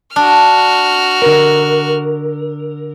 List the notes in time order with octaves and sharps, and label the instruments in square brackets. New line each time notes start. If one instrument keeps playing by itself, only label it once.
[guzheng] D4 [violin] F#4 F6
[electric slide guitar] D3 A#4